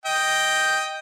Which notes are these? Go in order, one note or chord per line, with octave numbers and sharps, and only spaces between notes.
D#5 G5